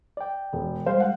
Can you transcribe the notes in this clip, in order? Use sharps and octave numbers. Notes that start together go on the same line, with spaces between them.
D5 G5
E1
G3 G#3 C5 F5
F#5